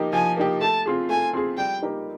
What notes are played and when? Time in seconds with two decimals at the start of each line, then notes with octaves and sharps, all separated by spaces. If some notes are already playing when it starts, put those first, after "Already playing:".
Already playing: F3 A#3 D#4 G4
0.13 F3 G#5
0.37 A#3 D#4 G4
0.61 A3 A5
0.86 C4 F4 G#4
1.09 A3 G#5
1.33 C4 F4 G#4
1.57 G3 G5
1.82 A#3 D#4 G4 A#4